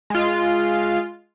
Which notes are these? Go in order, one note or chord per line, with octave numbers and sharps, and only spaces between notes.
G#3 F4